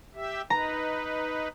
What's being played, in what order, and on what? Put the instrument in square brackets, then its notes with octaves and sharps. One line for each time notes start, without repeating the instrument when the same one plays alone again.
[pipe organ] G4 E5
[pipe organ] D#4 B4 [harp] A#5